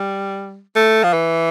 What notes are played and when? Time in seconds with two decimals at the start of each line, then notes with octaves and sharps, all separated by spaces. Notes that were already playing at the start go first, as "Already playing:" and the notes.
Already playing: G3
0.76 A3
1.04 F3
1.13 E3